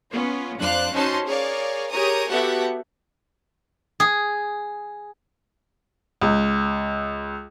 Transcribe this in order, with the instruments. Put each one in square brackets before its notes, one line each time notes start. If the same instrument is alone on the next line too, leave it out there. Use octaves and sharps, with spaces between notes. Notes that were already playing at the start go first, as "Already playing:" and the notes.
[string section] B3 C#4 F4
F2 D4 C5 F5 F#6
C#4 D#4 F#4 C5 A5 C6
G#4 A#4 C#5 D5 F5
G4 G#4 A#4 C#5 A#5 D#6
B3 F#4 G4 A4 E5 F#5
[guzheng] G#4
[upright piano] C#2